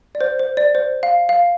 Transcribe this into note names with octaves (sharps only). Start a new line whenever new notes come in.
D5
C5
C5
D5
C5
F5
F5